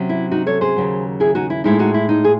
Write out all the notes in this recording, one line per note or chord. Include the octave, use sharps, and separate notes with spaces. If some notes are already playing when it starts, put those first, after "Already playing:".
Already playing: C3 F#3 C#4
E4
D#4 F#4
A4 C#5
G#4 C5
D#2 C#3 F#3
E4 G#4
D#4 F#4
E4
A2 G#3 D#4 E4
D#4 F#4
E4
D#4
G#4